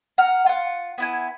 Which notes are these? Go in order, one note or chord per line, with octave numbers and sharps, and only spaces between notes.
F#5 A#5 F6
F4 F#5
B3 E4 G#5